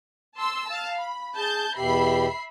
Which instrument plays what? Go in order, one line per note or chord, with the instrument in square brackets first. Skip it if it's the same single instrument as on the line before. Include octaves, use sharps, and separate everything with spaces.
[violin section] A5 C6 E6
F5 A5
B5
[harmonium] G#4 [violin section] A5 G6
[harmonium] E2 B2 G4 [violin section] E5 B5 C7